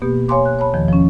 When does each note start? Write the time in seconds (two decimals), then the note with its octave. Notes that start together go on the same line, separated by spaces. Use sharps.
0.02 B2 A#3 B3 G4
0.28 C#5 F5 G#5 A#5 C6 D6
0.45 F#6
0.59 C#5 A5 B5
0.74 E2 D#3 F3
0.88 F3 C#4